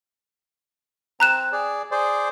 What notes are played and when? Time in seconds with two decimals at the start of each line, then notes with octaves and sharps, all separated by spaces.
1.20 C4 A#5 F#6 E7
1.52 G#4 D5
1.91 G#4 C5 D5